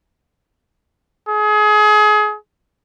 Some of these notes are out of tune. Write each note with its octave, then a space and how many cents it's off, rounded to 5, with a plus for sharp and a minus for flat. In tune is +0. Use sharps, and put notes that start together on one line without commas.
G#4 +30